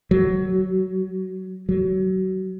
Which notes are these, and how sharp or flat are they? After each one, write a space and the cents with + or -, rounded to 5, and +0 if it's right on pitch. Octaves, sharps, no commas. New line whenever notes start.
F#3 +15
F#3 +25